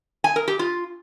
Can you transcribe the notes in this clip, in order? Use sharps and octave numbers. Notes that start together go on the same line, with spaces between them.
G#5
A#4
G4
F4